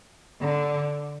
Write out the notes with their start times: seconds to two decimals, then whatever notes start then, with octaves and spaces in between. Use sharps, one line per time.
0.41 D3